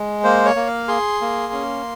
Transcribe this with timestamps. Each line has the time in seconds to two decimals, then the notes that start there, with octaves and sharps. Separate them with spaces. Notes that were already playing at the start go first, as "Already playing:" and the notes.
Already playing: G#3
0.24 A#3 C5
0.45 C#5
0.56 A#3
0.67 F5
0.88 G#4 C6
1.21 A#3
1.53 C#4